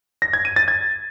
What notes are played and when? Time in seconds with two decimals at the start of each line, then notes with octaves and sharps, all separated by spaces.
0.22 A#6
0.33 G#6
0.45 D#7
0.56 A6
0.68 G#6